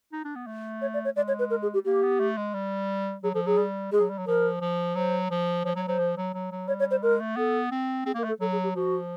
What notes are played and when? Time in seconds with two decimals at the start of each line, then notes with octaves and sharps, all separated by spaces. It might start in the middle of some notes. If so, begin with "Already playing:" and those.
0.13 D#4
0.25 D4
0.36 B3
0.47 A3
0.81 C#5
0.94 D5
1.05 C#5
1.16 G#3 D5
1.28 C#5
1.39 B4
1.50 A#4
1.62 G#4
1.74 G4
1.85 A#3 G4
2.02 B3
2.20 A3
2.37 G#3
2.54 G3
3.23 F#3 G#4
3.34 F3 A4
3.46 F#3 G#4
3.58 G3
3.92 G#3 G#4
4.00 F#3
4.09 G3
4.18 F#3
4.27 F3 A#4
4.61 F3
4.95 F#3 C5
5.31 F3
5.65 F3 C#5
5.76 F#3 C#5
5.87 F#3 C5
5.99 F3
6.17 F#3
6.34 F#3
6.51 F#3
6.68 G3 C#5
6.79 C#5
6.91 C5
7.02 G#3 A#4
7.20 A3
7.37 B3 A4
7.72 C4
8.05 C4 G#4
8.15 A#3
8.18 A#4
8.24 A3
8.29 A4
8.41 F#3 A4
8.52 G#4
8.63 G4
8.75 F3 F#4